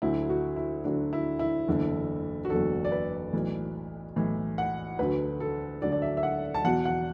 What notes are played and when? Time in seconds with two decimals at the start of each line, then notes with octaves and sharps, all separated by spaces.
0.02 D2 D3 F#3 E4
0.29 F#4
0.56 E4
0.84 D2 D3 F#3 D4
1.13 E4
1.39 E4
1.68 F#1 E2 D3
2.45 F#4
2.50 F#1 E2 D3 A4
2.85 D5
2.92 B4
3.33 B1 A2 E3
4.16 B1 A2 E3
4.58 F#5
4.99 D2 D3 F#3 B4
5.40 A4
5.82 D2 D3 F#3 D5
5.92 D5
6.02 E5
6.17 E5
6.23 F#5
6.54 A5
6.64 E2 B2 F#3 F#5
6.85 F#5